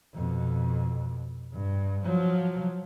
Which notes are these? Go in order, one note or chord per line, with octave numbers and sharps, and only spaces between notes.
F2 B2
G2
F3 F#3